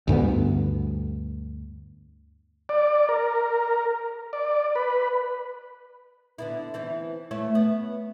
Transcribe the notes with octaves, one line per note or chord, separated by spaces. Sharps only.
D2 G2 D3 B3
D5
A#4
D5
B4
D3 B3 E4
E3 C4 E4
A3 E4 C#5
B3